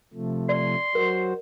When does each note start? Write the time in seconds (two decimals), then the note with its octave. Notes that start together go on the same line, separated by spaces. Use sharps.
0.14 C3 F3 A3
0.49 D5 C6
0.95 F#3 F#4 A#4 C5